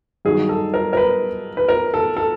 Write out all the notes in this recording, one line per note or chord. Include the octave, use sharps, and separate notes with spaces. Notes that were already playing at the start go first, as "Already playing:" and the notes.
G2 D#3 F#3 G#4
A4
A#4
A#4
B4
B4
A#4
A4
A4